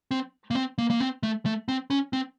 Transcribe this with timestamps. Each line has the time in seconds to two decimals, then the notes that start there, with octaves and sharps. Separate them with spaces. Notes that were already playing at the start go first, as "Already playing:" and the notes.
0.11 C4
0.51 A#3
0.55 C4
0.78 A#3
0.90 A#3
1.00 C4
1.23 A3
1.46 A3
1.68 C4
1.90 C#4
2.13 C4